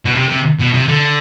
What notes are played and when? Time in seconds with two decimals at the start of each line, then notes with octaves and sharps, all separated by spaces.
0.05 B2
0.15 C3
0.29 C3
0.59 B2
0.74 C3
0.88 D3